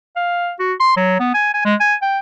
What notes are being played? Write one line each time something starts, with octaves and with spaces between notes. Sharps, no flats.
F5
F#4
C6
F#3
B3
G#5
G#5
G#3
G#5
G5